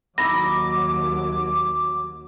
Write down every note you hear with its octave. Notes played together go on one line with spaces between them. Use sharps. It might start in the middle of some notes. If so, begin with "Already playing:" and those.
D#2 F#3 D#4 E4 B5 D6 A#6